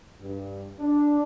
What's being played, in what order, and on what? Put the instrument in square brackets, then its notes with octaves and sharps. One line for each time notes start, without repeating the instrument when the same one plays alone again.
[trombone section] G2
D4